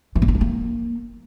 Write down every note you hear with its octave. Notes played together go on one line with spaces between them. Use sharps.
E3
A#3
C4
D4
A#3